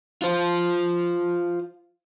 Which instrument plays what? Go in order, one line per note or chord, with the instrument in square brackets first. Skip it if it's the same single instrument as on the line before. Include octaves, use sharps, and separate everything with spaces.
[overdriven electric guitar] F4 C5